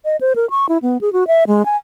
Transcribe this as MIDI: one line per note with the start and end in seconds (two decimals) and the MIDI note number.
0.05 0.16 75
0.21 0.33 72
0.36 0.49 70
0.50 0.66 85
0.69 0.78 64
0.82 0.97 59
1.01 1.12 68
1.13 1.27 66
1.27 1.44 76
1.47 1.65 56
1.65 1.76 80